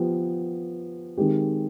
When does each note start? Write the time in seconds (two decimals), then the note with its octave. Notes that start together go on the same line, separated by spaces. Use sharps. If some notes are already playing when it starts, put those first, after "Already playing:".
Already playing: F3 B3 G4
1.17 D#3 G#3 C4 G4